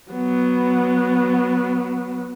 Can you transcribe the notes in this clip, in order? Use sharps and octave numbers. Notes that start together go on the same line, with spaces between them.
F#3 B3